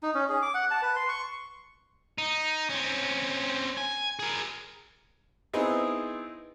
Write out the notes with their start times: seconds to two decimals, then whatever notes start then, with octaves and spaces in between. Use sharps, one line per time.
0.03 D#4
0.15 C#4
0.29 G#4
0.42 D6
0.54 F#5
0.71 A5
0.82 B4
0.96 C6
1.09 C#6
2.18 D#4
2.70 C4 C#4
3.78 G#5
4.19 G#4 A#4
5.53 B3 C4 D#4 E4 G#4